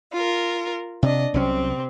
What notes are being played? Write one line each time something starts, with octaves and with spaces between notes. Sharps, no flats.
F4 A#4
C3 D4 D#5
C2 C3 F#3 C4 C#4